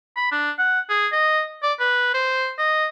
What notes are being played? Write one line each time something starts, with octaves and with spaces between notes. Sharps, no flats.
B5
D4
F#5
G#4
D#5
D5
B4
C5
D#5